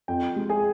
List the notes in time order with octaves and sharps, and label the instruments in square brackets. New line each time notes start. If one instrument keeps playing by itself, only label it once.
[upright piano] F2 [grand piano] G5
[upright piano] G#3
[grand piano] G#4 G#5